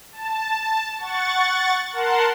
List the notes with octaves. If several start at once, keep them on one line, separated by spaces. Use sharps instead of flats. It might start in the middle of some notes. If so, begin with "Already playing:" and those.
A5
F#5 C#6 A6
A#4 F#5 A5 C6